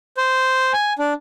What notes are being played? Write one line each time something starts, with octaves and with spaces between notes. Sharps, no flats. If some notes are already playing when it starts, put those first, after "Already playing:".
C5
G#5
D4